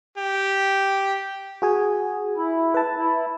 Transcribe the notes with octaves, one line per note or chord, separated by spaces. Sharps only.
G4
F#4 G#4 G#5
E4
B4 A5
E4